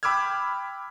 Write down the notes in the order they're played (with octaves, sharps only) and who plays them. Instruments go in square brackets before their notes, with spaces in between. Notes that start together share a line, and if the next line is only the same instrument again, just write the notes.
[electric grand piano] G5 B5 D6 E6 F6 G#6